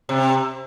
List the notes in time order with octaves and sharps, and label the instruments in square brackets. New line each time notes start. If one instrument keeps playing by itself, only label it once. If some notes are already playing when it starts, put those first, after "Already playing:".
[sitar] C3